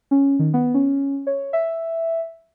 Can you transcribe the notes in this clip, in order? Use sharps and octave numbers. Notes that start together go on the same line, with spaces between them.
C#4
D#3
B3
C#4
C#5
E5